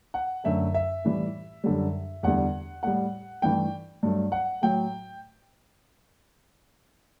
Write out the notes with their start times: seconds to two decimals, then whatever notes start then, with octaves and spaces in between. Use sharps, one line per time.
0.14 F#5
0.44 F#2 D3 A3 E5
0.74 E5
1.05 A2 E3 G3
1.64 F#2 D3 G3
2.23 E2 D3 G3 F#5
2.83 A2 G3 F#5
3.42 G2 E3 A3 G5
4.03 G2 F#3 A3
4.32 F#5
4.62 A2 F#3 A3 G5